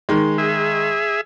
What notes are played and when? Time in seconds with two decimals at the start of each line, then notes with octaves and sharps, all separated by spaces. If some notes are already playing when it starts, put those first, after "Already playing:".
0.09 D#3 G#3
0.38 G#4 E5